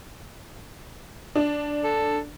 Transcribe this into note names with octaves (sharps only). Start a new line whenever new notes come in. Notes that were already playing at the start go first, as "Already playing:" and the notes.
D4
A4